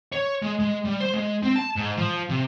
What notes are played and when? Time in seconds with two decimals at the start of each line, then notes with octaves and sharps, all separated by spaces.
0.12 C#5
0.42 G#3
0.59 G#3
0.85 G3
1.00 C5
1.14 G#3
1.43 C4
1.56 A5
1.76 G#2
1.97 F3
2.29 C3